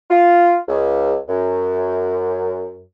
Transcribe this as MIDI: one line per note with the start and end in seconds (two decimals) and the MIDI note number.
0.10 0.58 65
0.68 1.17 37
1.28 2.82 42